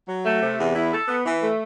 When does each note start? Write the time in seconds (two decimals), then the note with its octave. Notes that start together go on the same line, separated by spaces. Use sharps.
0.09 F#3
0.25 A3
0.41 C3
0.59 E2
0.75 E4
0.93 A4
1.08 B3
1.26 E3
1.42 A3